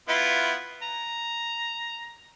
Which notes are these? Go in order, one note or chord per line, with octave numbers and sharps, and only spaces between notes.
B3 E4 F4
A#5